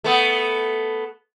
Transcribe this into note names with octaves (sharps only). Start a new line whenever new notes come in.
A3 B3